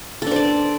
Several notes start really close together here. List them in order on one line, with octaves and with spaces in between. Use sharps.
A4 D4 C5 D5